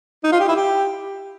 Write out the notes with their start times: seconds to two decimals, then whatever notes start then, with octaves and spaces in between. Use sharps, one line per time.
0.24 D#4
0.32 F4
0.40 G4
0.48 E4
0.56 G4